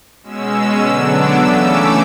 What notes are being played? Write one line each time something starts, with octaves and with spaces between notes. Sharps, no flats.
B2 G#3 C#4 E6
D3 F#3 B3 D4
D6
C#3 E3 A3 C#4 E6
D6